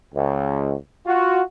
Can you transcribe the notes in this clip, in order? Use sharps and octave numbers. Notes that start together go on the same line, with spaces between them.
C#2
F4 F#4